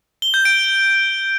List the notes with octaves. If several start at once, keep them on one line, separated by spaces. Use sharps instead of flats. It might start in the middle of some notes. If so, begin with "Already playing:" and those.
G7
G6
D7